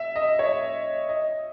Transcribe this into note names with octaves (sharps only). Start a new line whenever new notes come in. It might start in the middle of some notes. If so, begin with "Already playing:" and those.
Already playing: E5
D#5
C#5
D#5